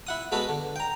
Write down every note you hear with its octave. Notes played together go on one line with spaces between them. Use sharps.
E4 F#5 D#6
G#3 B3 F#4 A4 B4
D3
G5 A#5